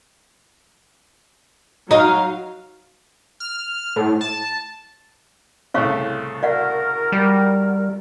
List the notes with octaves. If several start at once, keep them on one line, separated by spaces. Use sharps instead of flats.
F#3 D#4 F5
F6
A2
A5
C2 A2 C#3 C#5 F5 C#6
F#4 A#4 D5 F5 F#5
G3